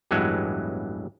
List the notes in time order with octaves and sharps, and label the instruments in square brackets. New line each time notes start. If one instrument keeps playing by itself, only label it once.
[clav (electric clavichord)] A1 E2 G2 E3 F#3 G#3